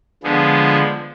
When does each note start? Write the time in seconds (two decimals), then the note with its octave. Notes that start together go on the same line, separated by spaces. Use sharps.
0.23 D3 F3 G#3 B3